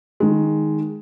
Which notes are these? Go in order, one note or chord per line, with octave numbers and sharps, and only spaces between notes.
D#3 G#3